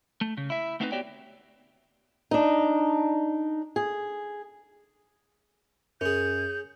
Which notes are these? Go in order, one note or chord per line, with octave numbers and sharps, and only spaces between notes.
A3
C#3
E4 E5
A3 B3 C4 D#4 G4 B4
B3 F#4 G4 C#5 D5 G5
D4 D#4
G#4
F#2 C#4 G#4 G6